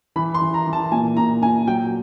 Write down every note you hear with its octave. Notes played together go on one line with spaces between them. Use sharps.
E3 B5
C6
E3
A#5
E3
A5
A#2 G#5
A#2 A#5
A#2 G#5
F#3 G5